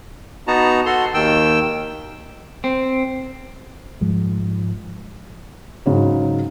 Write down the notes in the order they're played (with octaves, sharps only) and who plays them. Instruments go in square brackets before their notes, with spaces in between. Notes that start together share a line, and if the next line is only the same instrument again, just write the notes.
[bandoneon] B3 D#4 F#4 A5 A#5
F#4 A4 C6
D#2 D#3 G5 E6
[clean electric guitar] C4
[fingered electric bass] G#2 F3 G#3
[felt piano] G#2 C#3 F#3